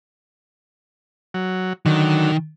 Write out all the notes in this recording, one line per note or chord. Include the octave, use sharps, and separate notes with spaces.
F#3
D3 D#3 F#3